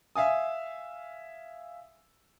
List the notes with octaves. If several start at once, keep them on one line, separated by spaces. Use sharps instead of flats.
E5 F5 G#5 D#6